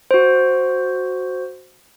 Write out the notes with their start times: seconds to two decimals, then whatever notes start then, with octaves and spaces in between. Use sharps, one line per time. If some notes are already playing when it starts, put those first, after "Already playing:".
0.11 F#4 C5